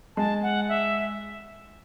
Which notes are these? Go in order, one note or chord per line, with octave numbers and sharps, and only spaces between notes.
G#3 A5
F#5
E5